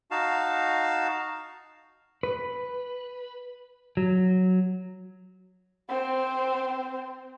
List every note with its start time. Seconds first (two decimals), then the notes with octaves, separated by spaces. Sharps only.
0.11 D#4 F#4 F5 A5
2.23 B4
3.97 F#3
5.89 C4 C5